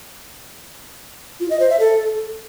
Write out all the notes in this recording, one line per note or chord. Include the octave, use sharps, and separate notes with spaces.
F4
D#5
C5
E5
A4